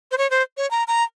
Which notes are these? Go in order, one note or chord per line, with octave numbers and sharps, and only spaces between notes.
C5
C#5
C5
C#5
A#5
A#5